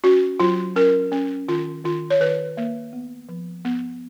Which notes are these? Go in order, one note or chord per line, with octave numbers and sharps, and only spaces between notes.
C#4 F#4
F#3 F4
C#4 A#4
C#4
D#3 F4
D#3 F4
C#5
D#3 B4
A#3
B3
F3
B3